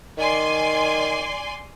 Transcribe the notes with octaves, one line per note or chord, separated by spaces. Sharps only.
D#3 D5 G#5 C6